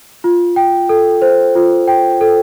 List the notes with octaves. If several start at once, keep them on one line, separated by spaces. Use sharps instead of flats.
F4
G5
A4
C5
F4
G5
A4